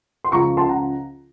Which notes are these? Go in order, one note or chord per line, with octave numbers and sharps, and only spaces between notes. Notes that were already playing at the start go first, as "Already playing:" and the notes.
C6
C#2 C#3 F3 A#5 C#6
A5 C6
F#5 A#5